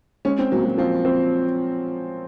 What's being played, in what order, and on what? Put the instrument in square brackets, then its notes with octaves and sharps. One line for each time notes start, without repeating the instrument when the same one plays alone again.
[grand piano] G#3 [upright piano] C#4
[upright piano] C4
[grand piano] A#2 [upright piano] F#3
[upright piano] F#3
[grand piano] F3 [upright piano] C4
[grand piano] C4